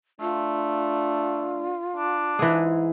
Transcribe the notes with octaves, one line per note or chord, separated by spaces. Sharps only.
A3 D4 F4
D4
G#2 E3 G#4